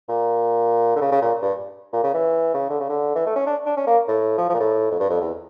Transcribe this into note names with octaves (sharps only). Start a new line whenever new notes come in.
A#2
D3
C#3
C#3
A#2
G2
A#2
C#3
E3
C#3
D3
C#3
D3
E3
A3
C#4
D4
D4
C#4
A#3
A2
F3
F3
A#2
A2
F2
G2
F2
E2